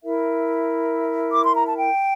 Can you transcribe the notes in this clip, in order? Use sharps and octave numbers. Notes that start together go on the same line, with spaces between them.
E4 A#4 E5
D6
C6
A#5
A5
G5